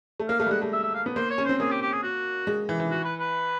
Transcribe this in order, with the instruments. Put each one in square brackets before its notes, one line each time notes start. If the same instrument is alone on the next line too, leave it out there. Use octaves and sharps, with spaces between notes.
[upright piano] A3
[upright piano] A#3 [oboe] F5
[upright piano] A3 [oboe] F5
[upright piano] G3
[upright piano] G#3 [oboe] F#5
[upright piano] A3
[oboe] E5
E5
F5
[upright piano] B3
[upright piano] A#3 [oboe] C5
[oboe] C#5
[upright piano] C#4
[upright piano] C4 [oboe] C5
[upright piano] A#3 [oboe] G#4
[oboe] G4
G4
G#4
F#4
[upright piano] G#3
E3
E3
[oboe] F#4
B4
B4